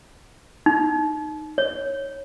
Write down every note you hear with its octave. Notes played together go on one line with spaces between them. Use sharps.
D#4
C#5